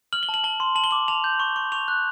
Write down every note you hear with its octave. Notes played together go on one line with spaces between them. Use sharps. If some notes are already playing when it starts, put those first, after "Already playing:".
F6 F#7
G7
A5
F#7
A5 G7
C6
A5 F#7
G7
D6 F#7
A5 F7
G6
C#6
C#6
C#6 F7
F#6